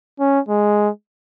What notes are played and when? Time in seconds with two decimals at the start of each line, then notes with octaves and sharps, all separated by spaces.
0.19 C#4
0.49 G#3